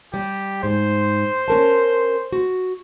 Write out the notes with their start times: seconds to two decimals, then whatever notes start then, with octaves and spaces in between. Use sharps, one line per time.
0.14 G3 G4
0.63 G#2 C5
1.48 C#4 A#4 A5
2.32 F#4